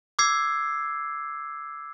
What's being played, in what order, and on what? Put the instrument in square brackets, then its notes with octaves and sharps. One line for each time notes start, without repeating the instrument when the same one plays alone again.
[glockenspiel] D6 E6 G#6 C7